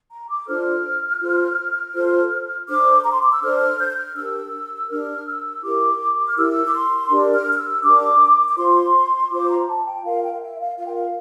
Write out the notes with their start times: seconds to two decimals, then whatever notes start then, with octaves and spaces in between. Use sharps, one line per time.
0.11 A#5
0.29 D6
0.47 D4 F4 A4 C5 F6
1.21 F4 A4 C5
1.95 F4 A4 C5
2.68 D4 A4 C5 D6
3.03 A#5
3.12 C6
3.22 D6
3.31 E6
3.42 D4 A4 C5 F6
3.60 F6
3.79 G6
3.91 G6
3.96 F6
4.15 D4 G4 A#4 E6
4.89 D4 G4 A#4 F6
5.26 E6
5.62 E4 G4 A#4 D6
6.27 F6
6.35 E4 G4 A#4 E6
6.66 D6
6.73 C6
7.09 D4 G4 A#4
7.34 F6
7.52 F6
7.58 E6
7.83 D4 G4 A#4 D6
8.48 D6
8.57 F4 C5 C6
9.30 F4 C5 D6
9.49 A#5
9.67 A5
9.86 G5
10.04 F4 A#4 F5
10.24 G5
10.32 F5
10.41 E5
10.59 F5
10.77 F4 A#4 F5
10.86 G5
10.94 F5